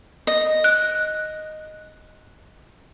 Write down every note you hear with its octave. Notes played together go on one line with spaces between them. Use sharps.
D#5
F#6